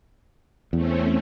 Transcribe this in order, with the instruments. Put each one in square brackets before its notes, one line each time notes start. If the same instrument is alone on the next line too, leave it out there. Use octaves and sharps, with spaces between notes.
[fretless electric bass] E2 [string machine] A3 C4 C#4